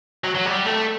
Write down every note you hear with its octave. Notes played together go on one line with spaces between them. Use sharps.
F#3
F#3
G3
A3